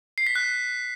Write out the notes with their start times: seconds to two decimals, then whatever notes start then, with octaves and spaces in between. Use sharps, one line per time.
0.18 C7
0.27 B6
0.35 F#6